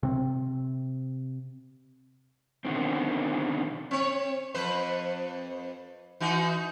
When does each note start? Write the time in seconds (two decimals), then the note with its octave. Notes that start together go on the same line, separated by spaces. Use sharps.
0.03 C3 C4
2.65 B2 D3 D#3 C4
3.91 C4 C#5
4.54 F2 B4 C5
6.20 E3 D#4 F#4